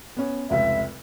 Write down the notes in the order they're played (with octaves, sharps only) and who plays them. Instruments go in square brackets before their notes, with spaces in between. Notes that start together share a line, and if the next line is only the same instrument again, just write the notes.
[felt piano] B3 C#4
[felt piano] F1 C#2 C3 [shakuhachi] E5